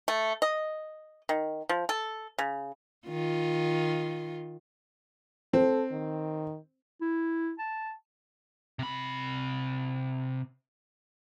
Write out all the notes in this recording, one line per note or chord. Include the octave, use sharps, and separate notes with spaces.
A3
D#5
D#3
F3
A4
C#3
D#3 F4
C4 A4
D#3
E4
A5
C3 B5